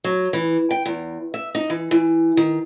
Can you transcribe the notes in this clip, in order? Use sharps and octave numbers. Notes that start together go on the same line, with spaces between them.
F#3
E3
G5
E2
E5
D#4
E3
E3
D#3